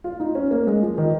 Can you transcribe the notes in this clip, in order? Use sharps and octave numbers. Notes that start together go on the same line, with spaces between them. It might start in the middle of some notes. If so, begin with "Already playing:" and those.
F4
D#4
C#4
A#3
G#3
F3
D#3